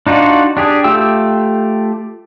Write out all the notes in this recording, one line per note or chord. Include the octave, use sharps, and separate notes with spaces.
D4 D#4 F4 F#4 D5
D4 G4 G#4
A3 F4 G4 G5 E6